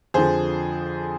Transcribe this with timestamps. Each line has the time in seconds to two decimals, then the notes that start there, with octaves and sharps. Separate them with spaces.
0.14 F2 D3 F3 G#4 C5